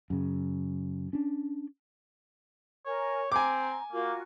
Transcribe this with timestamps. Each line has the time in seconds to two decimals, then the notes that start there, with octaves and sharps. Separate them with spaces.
0.10 F#2 C#3
1.13 C#4 D4
2.86 A#4 C#5 G#5
3.32 C4 G#5 A#5 D6
3.92 A#3 F4 F#4 A#4